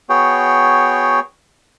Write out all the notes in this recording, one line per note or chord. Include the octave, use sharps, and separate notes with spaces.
B3 F#4 G#4 C#5 G5